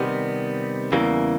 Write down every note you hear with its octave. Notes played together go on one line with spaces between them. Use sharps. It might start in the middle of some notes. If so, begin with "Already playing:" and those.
Already playing: C3 D#3 G3 B3
E2 C#3 E3 G3 A#3